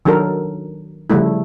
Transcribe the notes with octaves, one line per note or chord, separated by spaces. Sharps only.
D#3 F#3 D4 A4 A#4
C#3 F3 G3 A3 E4